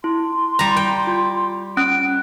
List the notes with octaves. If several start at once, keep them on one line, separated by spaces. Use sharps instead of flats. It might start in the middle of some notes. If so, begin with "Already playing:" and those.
E4 C6
G3 A#5
G5
F4
C#4 F#6 D7